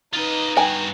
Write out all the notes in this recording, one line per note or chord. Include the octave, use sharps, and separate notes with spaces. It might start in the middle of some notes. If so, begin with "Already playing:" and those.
D#4 F4 B4 D#5
G2 F#4 G5 G#5